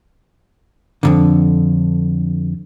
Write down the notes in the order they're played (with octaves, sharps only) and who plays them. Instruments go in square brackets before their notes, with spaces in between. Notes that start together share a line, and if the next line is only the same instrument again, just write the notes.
[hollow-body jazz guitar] F2 G#2 D3